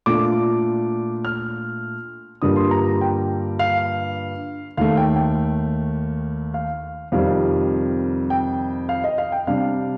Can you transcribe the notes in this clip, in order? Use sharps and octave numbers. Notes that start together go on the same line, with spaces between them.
A#2 A3 D4 F4 D6
F6
G2 D3 G3 A#3 F4 D#6
C6
A#5
G5
F5
D#2 D#3 A3 F5
G5
G5
F5
F2 C3 D#3 G3 F5
G5
F5
D#5
F5
G5
C3 G3 D4 F5